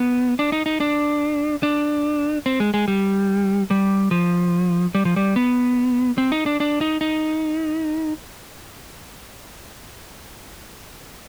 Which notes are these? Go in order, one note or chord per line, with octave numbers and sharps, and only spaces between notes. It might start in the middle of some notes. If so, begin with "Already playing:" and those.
Already playing: B3
D4
D#4
D#4
D4
D4
C4
G#3
G#3
G3
G3
F3
G3
F3
G3
B3
C4
D#4
D4
D4
D#4
D#4